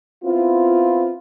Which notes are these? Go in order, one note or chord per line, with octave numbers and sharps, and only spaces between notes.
B3 C4 E4 F4